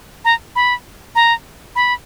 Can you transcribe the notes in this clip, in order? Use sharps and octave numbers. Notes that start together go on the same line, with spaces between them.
A#5
B5
A#5
B5